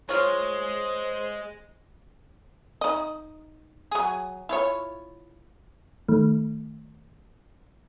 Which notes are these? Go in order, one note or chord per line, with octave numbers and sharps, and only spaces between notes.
G#3 F4 C5 C#5
D#4 D#5
F#3 G#4
E4 F4 C#5
D#3 A3